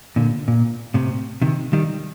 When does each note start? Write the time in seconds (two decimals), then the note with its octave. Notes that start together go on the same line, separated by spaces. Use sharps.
0.16 A#2 D3
0.48 A#2
0.94 A2 C3
1.41 C3 D#3
1.73 D#3 G3